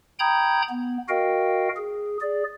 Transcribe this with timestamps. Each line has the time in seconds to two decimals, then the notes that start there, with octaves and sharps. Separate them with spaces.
0.19 G5 A#5 B5 D#6 G6 G#6
0.70 B3
1.09 F#4 A#4 D#5 F5 G5
1.77 G#4
2.21 G#4 D5